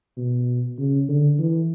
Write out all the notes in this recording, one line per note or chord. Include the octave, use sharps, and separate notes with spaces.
B2
C#3
D3
E3